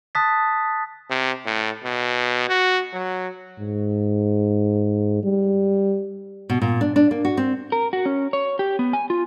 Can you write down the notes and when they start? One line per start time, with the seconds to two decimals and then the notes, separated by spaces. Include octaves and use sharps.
0.15 A5 D#6 F#6 A6 B6
1.10 C3
1.45 A2
1.84 B2
2.49 F#4
2.93 F#3
3.59 G#2
5.23 G3
6.50 B2
6.62 A#2
6.81 D4
6.96 D4
7.11 A#3
7.25 F#4
7.37 C4
7.72 A#4
7.93 F#4
8.06 C#4
8.33 C#5
8.59 G4
8.79 B3
8.93 G#5
9.10 F4